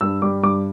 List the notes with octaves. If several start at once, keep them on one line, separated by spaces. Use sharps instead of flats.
G2 E6
G3 D6
G2 D6